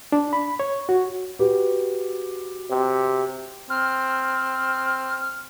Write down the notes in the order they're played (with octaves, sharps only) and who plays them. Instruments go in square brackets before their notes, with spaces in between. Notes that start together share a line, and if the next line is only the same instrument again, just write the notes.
[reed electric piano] D4
B5
C#5
F#4
[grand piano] F#4 G4 B4
[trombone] C3
[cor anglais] C4 [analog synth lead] F6